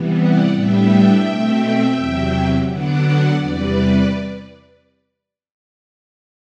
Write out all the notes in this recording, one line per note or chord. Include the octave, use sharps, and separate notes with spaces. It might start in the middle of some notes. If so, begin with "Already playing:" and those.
Already playing: C3 E3 G3 B3
D5 F#5
A2 G3 B3 D4 E5 G5
B2 A3 C4
E2 C3 F#3
D3 F#3 B3 D4 D5 F#5
E2 C3 G3 B4 D5